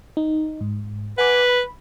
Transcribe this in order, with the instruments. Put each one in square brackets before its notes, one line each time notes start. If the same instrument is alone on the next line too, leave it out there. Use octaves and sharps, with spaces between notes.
[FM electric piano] D#4
G#2
[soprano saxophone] B4 [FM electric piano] F#5 G#5 D6
[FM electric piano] B5